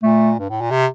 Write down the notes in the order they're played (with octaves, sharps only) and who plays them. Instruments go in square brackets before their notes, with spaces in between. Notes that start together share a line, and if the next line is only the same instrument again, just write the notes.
[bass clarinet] A#2 [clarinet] A3
[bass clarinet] G2
A2
A#2
C3